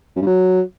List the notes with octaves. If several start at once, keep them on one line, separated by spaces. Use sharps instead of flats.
F#2
G2
F#3